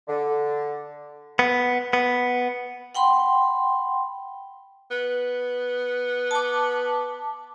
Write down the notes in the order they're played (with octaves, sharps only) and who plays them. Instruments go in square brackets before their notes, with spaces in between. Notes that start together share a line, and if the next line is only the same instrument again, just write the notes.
[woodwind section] D3
[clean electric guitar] B3
B3
[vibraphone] F#5 G5 B5 C6
[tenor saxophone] B3
[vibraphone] A5 D6